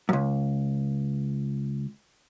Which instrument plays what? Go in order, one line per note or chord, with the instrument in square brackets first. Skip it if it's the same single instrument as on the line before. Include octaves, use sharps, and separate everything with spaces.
[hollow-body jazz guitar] C#2 F#2